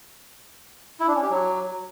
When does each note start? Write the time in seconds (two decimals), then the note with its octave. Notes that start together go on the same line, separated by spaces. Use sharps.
1.00 E4
1.07 D4
1.15 C#4
1.22 G4
1.30 F#3